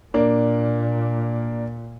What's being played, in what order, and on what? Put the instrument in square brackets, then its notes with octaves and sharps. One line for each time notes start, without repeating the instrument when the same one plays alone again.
[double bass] A#2 [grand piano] A#3 D4